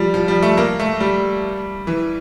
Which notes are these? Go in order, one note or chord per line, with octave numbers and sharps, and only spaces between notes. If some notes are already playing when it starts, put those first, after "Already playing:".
Already playing: F3 G3
F3
G3
A3
A#3
A3
G3
E3